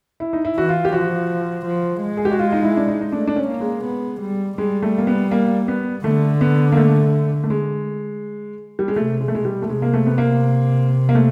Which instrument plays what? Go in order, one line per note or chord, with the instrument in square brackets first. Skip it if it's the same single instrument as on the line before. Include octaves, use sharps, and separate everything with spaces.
[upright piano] E4
D#4
E4
[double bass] E3 [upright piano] F#4
[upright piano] F4
G4
[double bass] F3 [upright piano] F#4
[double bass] F3
G#3
[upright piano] G#4
G4
F#4
F4
D#4
E4
D4
D#4
D#4
[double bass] A3 [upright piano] D4
[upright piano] D4
C#4
[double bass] A#3
[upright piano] G#3
[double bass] B3
G3
[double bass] G3 [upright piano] G#3
[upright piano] A3
A#3
B3
A#3
B3
[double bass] D3 [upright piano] A3
[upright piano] B3
A#3
A3
A3
G#3
G3
G#3
[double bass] C3 [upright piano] A3
[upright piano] G#3
A3
[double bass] B2 [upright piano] G#3
[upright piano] G3
A3
[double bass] C3 [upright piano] G#3
[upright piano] A#3
A3
B3
A#3
A#3
A3